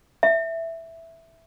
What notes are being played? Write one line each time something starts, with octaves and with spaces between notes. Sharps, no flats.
E5